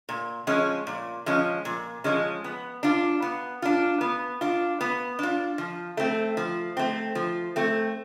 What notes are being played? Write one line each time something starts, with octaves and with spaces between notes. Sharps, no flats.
A#2
F3 G#3 C#4
A#2
F3 G#3 C#4
A#2
F3 G#3 C#4
B3
D4 F4
B3
D4 F4
B3
D4 F4
B3
D4 F4
F3
A3 C4
F3
A3 C4
F3
A3 C4